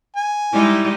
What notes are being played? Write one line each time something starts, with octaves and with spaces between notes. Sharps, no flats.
G#5
G3 G#3 D#4 E4